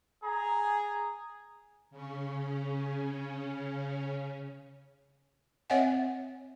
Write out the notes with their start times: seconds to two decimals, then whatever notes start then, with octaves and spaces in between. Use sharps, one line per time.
0.24 G#4 G#5 A#5
1.91 C#3 C#4
5.70 C4 C#5 D#5 E5 F#5 G#5